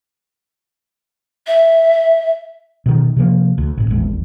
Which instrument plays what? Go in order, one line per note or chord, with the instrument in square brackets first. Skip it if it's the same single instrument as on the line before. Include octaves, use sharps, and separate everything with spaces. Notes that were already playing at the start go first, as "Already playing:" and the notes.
[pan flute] E5
[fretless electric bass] B2 D#3
C3 F3 A#3
D2
A1 G#2
D#1 G#1 E2 G#3